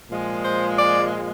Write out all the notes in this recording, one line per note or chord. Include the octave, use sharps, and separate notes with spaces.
A#2 F3 G#3
C5
D5